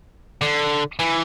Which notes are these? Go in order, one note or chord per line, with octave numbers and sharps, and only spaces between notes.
D3
E3